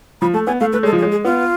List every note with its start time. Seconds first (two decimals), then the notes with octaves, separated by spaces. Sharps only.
0.21 F3 B5
0.34 A3 A5
0.47 B3 G#5
0.60 A3 F5
0.73 A3 B4
0.83 G#3 A4
0.92 F3
0.99 G#4
1.02 G#3
1.12 G#4
1.25 B3 F4